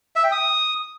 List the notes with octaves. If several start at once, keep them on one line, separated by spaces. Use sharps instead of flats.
E5
G5
D#6